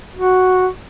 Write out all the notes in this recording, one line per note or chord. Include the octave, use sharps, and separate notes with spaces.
F#4